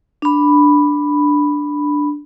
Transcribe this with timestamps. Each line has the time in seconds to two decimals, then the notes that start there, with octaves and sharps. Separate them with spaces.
0.22 D4 B5